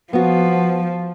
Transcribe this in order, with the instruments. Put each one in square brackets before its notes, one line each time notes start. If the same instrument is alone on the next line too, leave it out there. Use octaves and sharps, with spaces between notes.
[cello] F3 [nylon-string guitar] B3 F#4